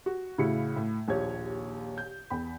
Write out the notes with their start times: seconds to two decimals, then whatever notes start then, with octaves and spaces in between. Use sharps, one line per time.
0.06 F#4
0.38 A2 C#3 E4 F#4 F5 C#7
0.76 A2
1.08 A#1 D#2 G4 C#5 G#6
1.98 G6
2.30 E2 G5 B5